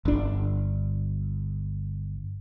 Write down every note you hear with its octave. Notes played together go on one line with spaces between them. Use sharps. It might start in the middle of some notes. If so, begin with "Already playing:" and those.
G1 D4